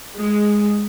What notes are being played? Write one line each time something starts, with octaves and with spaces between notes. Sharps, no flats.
G#3